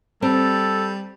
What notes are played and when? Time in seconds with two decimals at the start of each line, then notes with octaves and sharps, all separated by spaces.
0.22 G3 C4 A4